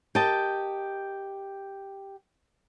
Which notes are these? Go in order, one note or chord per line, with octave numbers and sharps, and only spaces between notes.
G4 A#4 D#5 A5